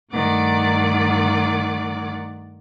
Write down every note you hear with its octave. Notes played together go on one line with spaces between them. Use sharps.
G2 D#3 A3 D5 F#5 D6